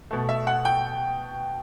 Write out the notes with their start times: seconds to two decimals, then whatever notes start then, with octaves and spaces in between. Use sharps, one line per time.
0.11 B2 A3
0.29 E5
0.47 F#5
0.65 G5